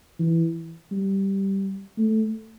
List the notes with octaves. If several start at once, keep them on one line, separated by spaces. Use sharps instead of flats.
E3
G3
A3